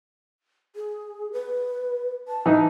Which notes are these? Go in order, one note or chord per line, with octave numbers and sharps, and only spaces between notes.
G#4
B4
A5
E3 D#4